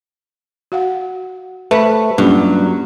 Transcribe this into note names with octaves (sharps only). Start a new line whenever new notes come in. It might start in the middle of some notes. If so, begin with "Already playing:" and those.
F#4 F5 F#5
A3 B4
G2 F#3 A#3 C#4 F4